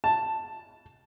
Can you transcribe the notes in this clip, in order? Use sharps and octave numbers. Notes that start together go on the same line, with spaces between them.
A5